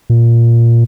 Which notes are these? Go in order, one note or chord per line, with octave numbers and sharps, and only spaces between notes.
A#2